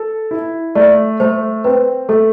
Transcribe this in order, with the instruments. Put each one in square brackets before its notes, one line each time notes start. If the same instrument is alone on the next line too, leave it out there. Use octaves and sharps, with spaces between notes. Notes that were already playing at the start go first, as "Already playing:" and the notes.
Already playing: [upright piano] A4
E4
[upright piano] A3 [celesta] D5
[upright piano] A3 [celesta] C5
[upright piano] C4 [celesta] B4
[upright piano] A3 [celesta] A4